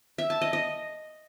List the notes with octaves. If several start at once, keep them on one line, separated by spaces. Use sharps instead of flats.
E5
A5
D#5
D#5